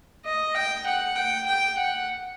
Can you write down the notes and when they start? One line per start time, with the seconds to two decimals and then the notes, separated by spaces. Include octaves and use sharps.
0.25 D#5
0.55 G5
0.86 F#5
1.16 G5
1.46 G5
1.78 F#5